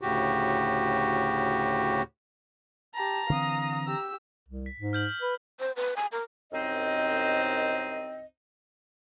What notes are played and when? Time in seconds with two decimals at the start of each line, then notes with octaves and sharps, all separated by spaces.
0.01 D2 A2 C#3 F#4 G4
2.95 G4 A5 A#5
3.30 D3 E3 C4 F5 D#6
3.87 G4 E6
4.49 C2
4.66 B6
4.80 G#2
4.93 F6 G6 F#7
5.22 B4
5.60 C5
5.76 B4
5.97 G#5
6.12 A#4
6.52 C2 F#2 C4 D#4 C5 D#5